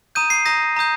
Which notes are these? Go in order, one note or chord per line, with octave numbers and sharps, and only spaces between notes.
A#5 D#6 G6 D#7
C7
A#5 D#6 G6 A#6
A#5 D#6 G6